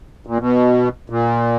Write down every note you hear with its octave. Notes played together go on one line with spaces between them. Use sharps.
A#2
B2
A#2